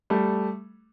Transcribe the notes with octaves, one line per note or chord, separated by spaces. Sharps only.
G3 A3